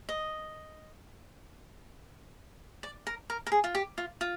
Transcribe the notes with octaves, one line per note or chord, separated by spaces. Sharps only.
D#5
D5
A#4
A#4
A#4
G#4
F4
G4
F4
F4